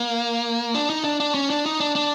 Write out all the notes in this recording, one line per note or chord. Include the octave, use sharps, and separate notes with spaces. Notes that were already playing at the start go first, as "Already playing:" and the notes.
Already playing: A#3
D4
D#4
D4
D4
C#4
D4
D#4
D4
D4